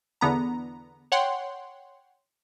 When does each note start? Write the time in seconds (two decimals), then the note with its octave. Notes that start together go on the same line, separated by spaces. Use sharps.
0.21 E2 D3 B3 A#5
1.12 C#5 F#5 G5 C6